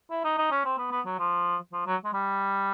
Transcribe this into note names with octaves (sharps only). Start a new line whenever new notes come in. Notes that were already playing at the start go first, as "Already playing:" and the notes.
E4
D#4
D#4
C#4
C4
B3
B3
F#3
F3
F3
F#3
G#3
G3